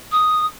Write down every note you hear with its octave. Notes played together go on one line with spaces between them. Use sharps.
D#6